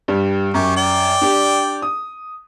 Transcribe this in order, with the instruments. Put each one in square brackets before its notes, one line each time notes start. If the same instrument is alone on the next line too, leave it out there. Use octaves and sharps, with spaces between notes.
[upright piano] G2 G3
[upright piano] F#2 [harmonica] G4 C#6
[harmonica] D5 G5
[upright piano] D4 G4
D#6